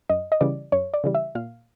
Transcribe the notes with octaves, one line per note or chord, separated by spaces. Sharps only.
F#2 D#5
D#5
C#3 E3 G3 D5
F#2 C#5
D5
C#3 E3 G3
E5
A#2 F5